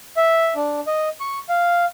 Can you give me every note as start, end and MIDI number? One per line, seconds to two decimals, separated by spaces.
0.17 0.54 76
0.55 0.80 62
0.87 1.09 75
1.20 1.39 85
1.49 1.85 77